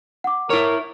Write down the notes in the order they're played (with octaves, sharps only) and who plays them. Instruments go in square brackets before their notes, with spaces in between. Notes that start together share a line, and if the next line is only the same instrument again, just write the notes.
[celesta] F#5 D6
[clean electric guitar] E4 C#5 [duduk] A#4